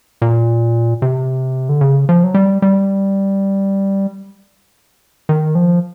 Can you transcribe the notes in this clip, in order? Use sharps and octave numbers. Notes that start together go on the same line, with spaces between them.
A#2
C3
D3
C#3
F3
F#3
G3
G3
D#3
F3